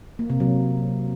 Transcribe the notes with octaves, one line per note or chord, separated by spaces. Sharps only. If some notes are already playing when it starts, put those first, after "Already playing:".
A#3
C3
F#3